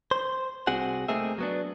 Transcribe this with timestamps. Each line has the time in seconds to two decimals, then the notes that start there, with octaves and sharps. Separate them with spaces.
0.11 C5
0.67 C2 C4 F#4 G#4 F#5
1.08 A3 A#3 C4 D#4 G#4 E5
1.38 F#3 B3 D4